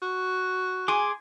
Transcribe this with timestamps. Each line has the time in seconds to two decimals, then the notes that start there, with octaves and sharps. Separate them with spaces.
0.02 F#4
0.88 G#4 G#5 C6 D6